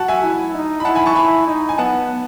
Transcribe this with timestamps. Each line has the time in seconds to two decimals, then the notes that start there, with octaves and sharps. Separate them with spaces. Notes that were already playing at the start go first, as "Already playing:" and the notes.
Already playing: F#4 F#5 A5
0.08 E5 G#5
0.23 E4
0.55 D#4
0.80 B5
0.85 E4 F#5 A5
0.95 G#5 B5
1.06 A5 C#6
1.16 E4 G#5 B5
1.48 D#4
1.69 G#5
1.78 B3 F#5 A5